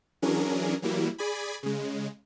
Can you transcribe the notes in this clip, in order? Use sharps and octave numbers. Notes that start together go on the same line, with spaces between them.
E3 F#3 C#4 D4 G#4 A#4
E3 F#3 G3 A#3 E4
G#4 D5 G#5 B5
C#3 G#3